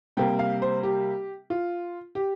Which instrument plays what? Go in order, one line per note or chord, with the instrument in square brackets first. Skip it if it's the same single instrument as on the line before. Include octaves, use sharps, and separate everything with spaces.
[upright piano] C3 G3 A#3 G5
F5
C5
G4
F4
G4